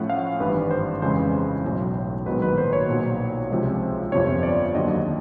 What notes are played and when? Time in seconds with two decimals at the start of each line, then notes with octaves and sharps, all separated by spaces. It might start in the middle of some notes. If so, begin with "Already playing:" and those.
Already playing: A2 F3 A3 C#4 F#5
0.10 F5
0.40 G#1 G2 E3 B4
0.71 C5
1.02 F2 C#3 E3 G#3 C5
1.64 B1 A2 F#3
2.26 A#1 G#2 D#3 F#3 B3 B4
2.42 B4
2.58 C5
2.73 C#5
2.88 B1 A#2 F#3 B3
3.50 C#2 C3 F3 G#3
4.12 G1 F2 C3 F3 C#5
4.43 D5
4.75 D#2 D3 F#3 D#5